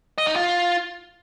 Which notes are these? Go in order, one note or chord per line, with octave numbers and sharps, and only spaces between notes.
D#5
D#4
F4